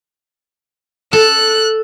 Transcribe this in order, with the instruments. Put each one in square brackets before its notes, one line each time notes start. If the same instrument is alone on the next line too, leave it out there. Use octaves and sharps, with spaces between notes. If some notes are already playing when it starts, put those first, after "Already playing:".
[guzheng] A4 [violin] F#6